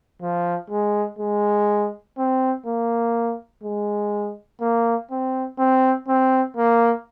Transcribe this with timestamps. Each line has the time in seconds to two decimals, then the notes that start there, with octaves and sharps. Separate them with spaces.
0.21 F3
0.70 G#3
1.19 G#3
2.18 C4
2.66 A#3
3.63 G#3
4.61 A#3
5.10 C4
5.59 C4
6.08 C4
6.57 A#3